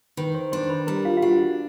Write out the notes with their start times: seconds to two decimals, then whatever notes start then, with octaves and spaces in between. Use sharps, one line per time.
0.17 D#3 B4
0.35 C5
0.52 D4 C5
0.70 B4
0.87 G3 A#4
1.05 F4
1.17 F4
1.22 D4 F#4